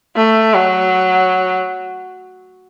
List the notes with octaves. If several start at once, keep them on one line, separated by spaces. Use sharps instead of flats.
A3
F#3